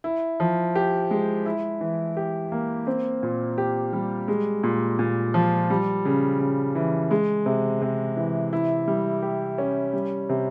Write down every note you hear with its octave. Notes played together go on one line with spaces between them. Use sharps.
E4
F3
G4
G#3
E4
E3
G4
A#3
C4
A#2
G4
G3
G#3
A#2
A#2
F3
G3
C#3
C#3
E3
G#3
C3
C3
E3
E4
G3
G4
C#4
G3
C3